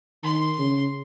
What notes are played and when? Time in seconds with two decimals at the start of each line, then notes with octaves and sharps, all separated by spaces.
0.23 D#3 C6
0.59 C#3